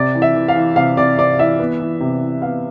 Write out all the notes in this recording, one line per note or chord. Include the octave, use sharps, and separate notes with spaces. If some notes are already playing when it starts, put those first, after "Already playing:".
Already playing: C3 D5
E3
E5
E3
F5
E3
C3 F5
C3 D5
C3 D5
E3 E5
B3
E3
C3
E3
B3 F5